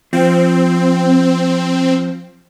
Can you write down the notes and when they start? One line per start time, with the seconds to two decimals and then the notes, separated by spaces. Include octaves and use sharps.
0.13 F3 C4